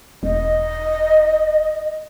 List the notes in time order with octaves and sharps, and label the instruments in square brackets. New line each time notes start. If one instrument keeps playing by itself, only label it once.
[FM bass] E1 [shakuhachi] D#5